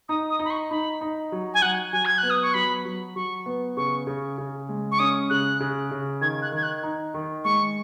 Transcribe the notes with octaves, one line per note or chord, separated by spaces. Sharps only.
D#4 D#6
D#6
D#4
B5
C#6
D#4 B5
D#4
F#3
G#5
F#3 F#5
F#3 G#5
G#6
F#6
B3
D#6
C#6
F#3 B5
F#3
F#3 C#6
B3
C#3 C#6
C#3
C#3
G#3
C#6
C#4 D#6
C#3 F#6
C#3
C#3
D#3 G#6
F#6
D#3 G#6
F#6
D#4
D#3
G#3 C#6